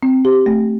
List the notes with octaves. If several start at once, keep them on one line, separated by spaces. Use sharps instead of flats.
C4
G4
A3